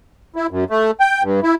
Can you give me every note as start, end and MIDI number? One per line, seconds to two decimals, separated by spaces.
0.36 0.47 64
0.51 0.64 42
0.70 0.91 57
1.00 1.23 79
1.23 1.40 43
1.43 1.55 64